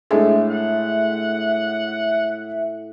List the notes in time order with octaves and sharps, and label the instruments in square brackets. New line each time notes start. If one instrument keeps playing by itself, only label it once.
[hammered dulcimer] A2 [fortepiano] G#3 A3 D4 [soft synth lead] E5
[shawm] F#5